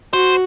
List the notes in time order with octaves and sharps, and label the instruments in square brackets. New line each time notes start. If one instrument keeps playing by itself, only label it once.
[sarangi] F#4 [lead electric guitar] C5